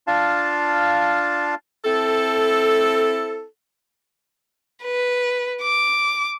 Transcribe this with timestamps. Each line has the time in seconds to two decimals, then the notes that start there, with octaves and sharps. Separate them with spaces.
0.07 D4 F4 F5 A5
1.85 C4 E4 A4
4.83 B4
5.62 D6